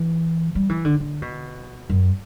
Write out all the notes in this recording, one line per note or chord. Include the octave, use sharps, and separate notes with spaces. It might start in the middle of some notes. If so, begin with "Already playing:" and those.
Already playing: E3
G3
E3
D3
D3
B2
F#2